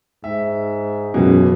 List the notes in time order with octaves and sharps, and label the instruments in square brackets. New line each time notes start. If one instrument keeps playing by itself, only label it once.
[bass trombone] G#2 [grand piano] E5
[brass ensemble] C#2 [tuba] F#2 [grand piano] B2 E3